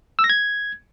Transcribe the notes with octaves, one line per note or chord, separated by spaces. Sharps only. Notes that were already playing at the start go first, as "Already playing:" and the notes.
E6
A#6
G#6